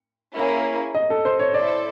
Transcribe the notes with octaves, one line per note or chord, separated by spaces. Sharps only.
A#3 C#4 E4 G#4 C#5
D#5
A4
C5
C#5
E4 A4 C5 D5 E5